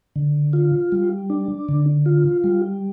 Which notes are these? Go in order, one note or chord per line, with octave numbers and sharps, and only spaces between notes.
D3
F4
G3
D4
D3
F4
G3